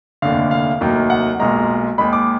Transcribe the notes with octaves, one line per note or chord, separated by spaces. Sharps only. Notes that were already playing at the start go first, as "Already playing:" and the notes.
F1 D#2 D3 F5
F5
F1 D#2 D#3 F#3
F#5
B1 A#2 G#3 A#5
D#2 D#3 G#3 B5
D6